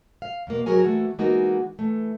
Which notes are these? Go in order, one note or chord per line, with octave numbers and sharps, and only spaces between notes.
F5
E2 B2 A#3
G#2 F#3 F#4 G#4 A#4 G#5
E3 A3 A#3 F#4
E3 G#3 A#3 B3 D#4 F#4
E3 A3